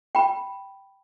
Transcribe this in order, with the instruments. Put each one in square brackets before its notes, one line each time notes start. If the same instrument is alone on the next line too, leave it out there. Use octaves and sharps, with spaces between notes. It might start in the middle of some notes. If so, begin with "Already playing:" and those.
[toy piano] G5 B5